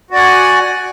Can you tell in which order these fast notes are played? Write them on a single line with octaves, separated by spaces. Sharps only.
F#4 D5 F#5 G#5